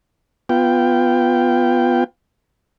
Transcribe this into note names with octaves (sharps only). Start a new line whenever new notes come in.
B3 F4 G5